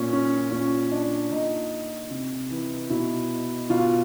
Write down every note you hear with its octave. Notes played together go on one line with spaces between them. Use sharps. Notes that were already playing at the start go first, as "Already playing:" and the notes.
Already playing: A#2 C#4
C#4
A#2 C#4
D4
A#2 D#4
C3
E3
B2 E4
B2 F4